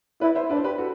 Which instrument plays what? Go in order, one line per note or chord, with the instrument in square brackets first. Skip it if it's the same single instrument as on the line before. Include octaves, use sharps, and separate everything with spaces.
[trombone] E4 [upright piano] B4 D5
[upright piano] C5 E5
[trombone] D4 [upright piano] B4 D5
[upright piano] C5
G4 B4
F#4 A4